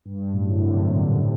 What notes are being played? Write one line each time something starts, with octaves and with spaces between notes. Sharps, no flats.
G2
F#2 A2
D3
A2 C3
A#2 D3
A2 C3